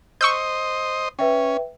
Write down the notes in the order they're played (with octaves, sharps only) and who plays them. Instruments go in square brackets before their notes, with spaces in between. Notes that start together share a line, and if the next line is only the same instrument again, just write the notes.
[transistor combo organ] C5 D#5 [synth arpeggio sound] C#6 E6 G6
[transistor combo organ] C#4 [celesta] B4 E5 G5